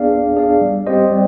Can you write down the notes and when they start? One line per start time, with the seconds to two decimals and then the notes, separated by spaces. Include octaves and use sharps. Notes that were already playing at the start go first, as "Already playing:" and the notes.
Already playing: B3 D4 G#4 D5 F5
0.11 B3
0.36 D4 G#4 D5 F5
0.61 G3
0.87 C4 G4 C5 D#5
1.11 G3